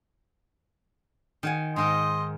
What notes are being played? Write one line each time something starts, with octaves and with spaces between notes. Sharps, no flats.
D#3 F#5 G#5
G#2 D#3 A#4 D#5 C6